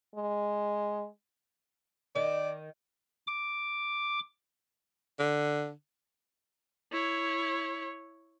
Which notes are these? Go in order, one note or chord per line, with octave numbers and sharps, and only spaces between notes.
G#3
D#3 D5
D6
D3
E4 C#5